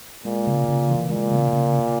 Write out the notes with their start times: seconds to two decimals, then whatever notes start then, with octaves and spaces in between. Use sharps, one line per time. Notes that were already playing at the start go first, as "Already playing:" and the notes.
0.25 A#2 G#3
0.47 C#3
0.68 C#3
0.89 E3
1.09 A#2 G#3
1.31 C#3
1.53 C#3